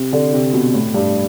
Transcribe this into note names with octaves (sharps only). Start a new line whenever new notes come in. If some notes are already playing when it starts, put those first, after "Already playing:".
Already playing: C3
D3
C3
B2
A2
G2